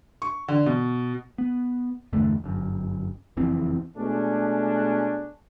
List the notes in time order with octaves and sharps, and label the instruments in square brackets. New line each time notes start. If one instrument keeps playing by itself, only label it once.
[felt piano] C#6
D3
B2
[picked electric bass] B3
E2 G2 D3 A3
G1 F#2
F#1 F2 E3 C4
[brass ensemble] B2 G#3 A3 C#4 D4